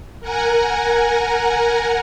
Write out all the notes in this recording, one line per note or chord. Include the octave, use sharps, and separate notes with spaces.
A#4 F#5 G#5 A#5